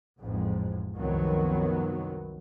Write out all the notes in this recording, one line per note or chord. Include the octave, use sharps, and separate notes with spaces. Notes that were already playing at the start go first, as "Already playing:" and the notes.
A1 F2 G#2
C2 F#2 D#3 F3 F#3 B3